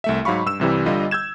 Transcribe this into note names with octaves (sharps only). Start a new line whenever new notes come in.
C2 A3 E5
G#2 F#3 F5 B5 C#6
G2 E6 E7
C2 C3 E3 G3
G1 D3 G3 F4 D#5
E6 G6 G#6 E7